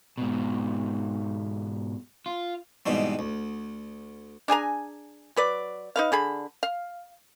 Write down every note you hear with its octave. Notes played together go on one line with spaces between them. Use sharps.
G#2 B2
F4
G#2 B2 E3 G3 C4
D2
D4 G#4 G#5 A#5
F#3 B4 D5
D#4 B4 F5
D3 G#4 B5
F5